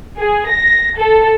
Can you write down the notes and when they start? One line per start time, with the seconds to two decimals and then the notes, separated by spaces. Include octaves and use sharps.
0.19 G#4
0.50 A#6
0.98 A4